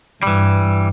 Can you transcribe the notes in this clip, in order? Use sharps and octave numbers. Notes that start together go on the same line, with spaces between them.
G2 E3 G3